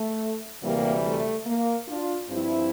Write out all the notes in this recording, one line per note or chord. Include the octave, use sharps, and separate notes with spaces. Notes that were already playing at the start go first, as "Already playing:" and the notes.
Already playing: A3
D2 C3 E3 G3 A#3
A3
A#3
D4 F4
G2 F3 C4 E4